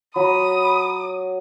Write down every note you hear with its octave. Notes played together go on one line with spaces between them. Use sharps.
F#3 B5 D#6